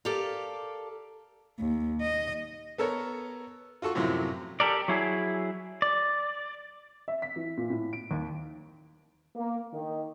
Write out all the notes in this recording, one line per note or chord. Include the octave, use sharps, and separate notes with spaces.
G4 A4 A#4 D5 F5
D#2
D#5
B3 A4 A#4 C#5
F4 F#4 A4 C#6
F#2 A2 C3 F3 F#3
G4 A4 A#4 D5
F#3 E4 G#4
D5
E5
B6
E3
A#2
A2
D7
D#2
A#3
D#3